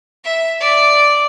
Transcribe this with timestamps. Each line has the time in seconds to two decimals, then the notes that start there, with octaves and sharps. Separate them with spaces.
0.24 E5
0.60 D5